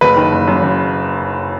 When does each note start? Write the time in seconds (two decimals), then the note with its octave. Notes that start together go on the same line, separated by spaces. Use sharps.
0.01 F#1 B4
0.16 D#3
0.32 F#1
0.47 F#2
0.62 F#1